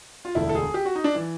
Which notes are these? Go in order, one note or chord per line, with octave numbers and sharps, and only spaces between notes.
F4
E1 D2 D3 E4
A4
G#4
G4
F#4
D#4
D4
E3